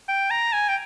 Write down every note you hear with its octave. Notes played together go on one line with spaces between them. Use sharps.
G5
A#5
G#5
G5